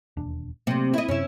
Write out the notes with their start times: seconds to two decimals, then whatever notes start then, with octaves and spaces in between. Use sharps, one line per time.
0.17 E1 D#2 D4
0.67 D2 C3 F#3 A3 A#3
0.94 E4 D#5
1.08 F#2 C3 C#4 E4